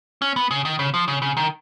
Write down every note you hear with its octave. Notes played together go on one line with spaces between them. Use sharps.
C#4
B3
C#3
D#3
C#3
F3
C#3
C#3
D#3